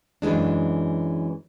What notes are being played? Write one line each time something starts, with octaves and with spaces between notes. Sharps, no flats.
F#2 E3 G#3 D4